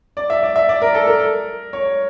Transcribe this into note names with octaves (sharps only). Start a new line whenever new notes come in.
D5
E5
D5
E5
D5
A#4
A4
A#4
C#5